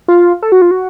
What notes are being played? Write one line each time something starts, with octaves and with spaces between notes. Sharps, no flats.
F4
A4
F#4
F4
F#4